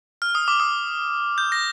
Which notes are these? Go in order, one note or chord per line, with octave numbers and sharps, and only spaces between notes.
F6
D#6
D6
D#6
G6
A#6